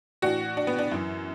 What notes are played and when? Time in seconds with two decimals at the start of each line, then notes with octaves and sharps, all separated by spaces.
0.22 A2 E3 D4 F#4
0.57 D4
0.67 B3
0.79 D4
0.91 F#2 E3